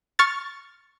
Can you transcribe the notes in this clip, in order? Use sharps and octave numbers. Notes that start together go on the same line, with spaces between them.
C#6 F6 A6